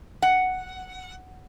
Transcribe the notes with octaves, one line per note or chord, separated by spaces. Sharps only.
F#5